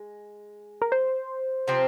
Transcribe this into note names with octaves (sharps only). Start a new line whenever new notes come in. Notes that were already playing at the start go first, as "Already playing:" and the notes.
Already playing: G#3
A#4
C5
C3 F3 C4